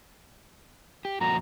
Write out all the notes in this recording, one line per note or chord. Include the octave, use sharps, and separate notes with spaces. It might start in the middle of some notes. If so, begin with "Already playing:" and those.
G4
F2 A#2 F#4 A#5